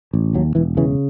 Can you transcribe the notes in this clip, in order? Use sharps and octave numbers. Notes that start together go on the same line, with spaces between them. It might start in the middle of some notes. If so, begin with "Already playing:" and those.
A1
D#2 F#3
E1 E3
C#3 E3